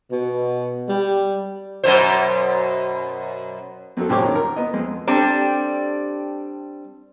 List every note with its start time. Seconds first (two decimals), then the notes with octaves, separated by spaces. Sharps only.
0.11 B2
0.89 G3
1.84 F#2 B2 C5
3.97 F2 F#3 A4
4.09 F#2 A2 G4 C5 C#5 D6
4.22 D#3 A4 A#5
4.35 A#4
4.56 B3 D#5
4.73 F2 G#3
5.07 G3 C4 D4 A4